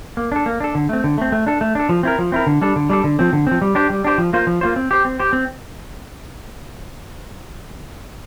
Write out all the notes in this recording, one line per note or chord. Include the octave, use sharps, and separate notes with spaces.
A#3
D4 A4
A#3
D4 A4
D3
A3 C4
D3
A3 C4
A3
D4 A4
A3
D4 A4
F3
C4 E4 A#4
F3
C4 E4 A#4
D3
G3 D4 A4
D3
G3 D4 A4
D3
F3 C4
D3
F3 C4
G3
D4 G4 C5
G3
D4 G4 C5
F3
A#3 F4 C5
F3
A#3 F4 C5
C4
G4 C5
C4
G4 C5
C4